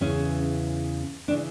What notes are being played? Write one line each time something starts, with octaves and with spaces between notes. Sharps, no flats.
E2 C#3 E3 C#4
C#3 E3 D4